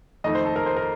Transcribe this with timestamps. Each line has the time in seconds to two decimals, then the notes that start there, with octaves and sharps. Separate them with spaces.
0.24 F2 D#3 A3 D#5
0.35 C5
0.45 A4
0.56 A#4
0.66 C5
0.77 A#4